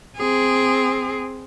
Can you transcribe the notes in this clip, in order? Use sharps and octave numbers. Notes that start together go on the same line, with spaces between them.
C4 G#4